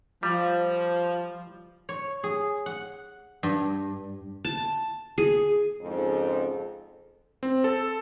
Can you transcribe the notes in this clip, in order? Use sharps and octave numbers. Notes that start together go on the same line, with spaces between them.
F3 G3
C#5
G#4
F#5
G2
A5
G#4
F2 G#2 C#3 F3 G#4 A4
C4
A4